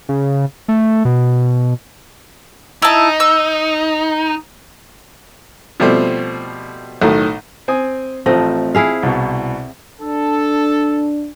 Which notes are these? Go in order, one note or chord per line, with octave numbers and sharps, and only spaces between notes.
C#3
A3
B2
D#4 E4 A5
E6
B2 F3 G3 A3 C4
B1 A2 D#3 A3
C4 G#5 D#6
A1 F3 A3 C4 D#5
E4 G#4 F5
C2 B2
D4 A4